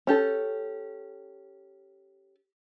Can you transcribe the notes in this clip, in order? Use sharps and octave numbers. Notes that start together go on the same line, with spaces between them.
C#4 G4 A4